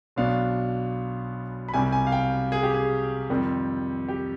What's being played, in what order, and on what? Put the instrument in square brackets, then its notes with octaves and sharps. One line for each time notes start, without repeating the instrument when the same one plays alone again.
[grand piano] B1 B2 B3 D4 F5
B5
C2 C3 G3 G#5
G#5
F5
G5
G#4
G4
G#4
F2 D#3 G3 C4
G4